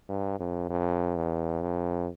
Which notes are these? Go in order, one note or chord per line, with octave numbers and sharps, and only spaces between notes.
G2
F2
F2
E2
F2